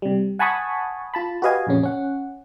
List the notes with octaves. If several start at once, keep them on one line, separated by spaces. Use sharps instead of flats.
C3 G3
F#5 G#5 A5 B5 C#6 D#6
F4 A5 B5
F#4 G4 B4 D#5 F5 G#5
A#1 F2 C#3 C#4
C#4 F#5